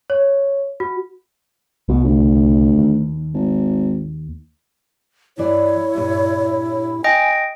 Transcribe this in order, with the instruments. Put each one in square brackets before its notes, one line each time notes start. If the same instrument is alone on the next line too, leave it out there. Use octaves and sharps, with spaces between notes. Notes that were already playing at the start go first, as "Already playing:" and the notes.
[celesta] C#5
F#4
[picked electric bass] C2 [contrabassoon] B2
[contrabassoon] D2
[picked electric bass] D#2
[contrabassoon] G#1
[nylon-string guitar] G2 E3 D5 [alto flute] E4 [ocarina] C#5
[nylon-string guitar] G2 A#2 G3
[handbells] D#5 G5 [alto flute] G#5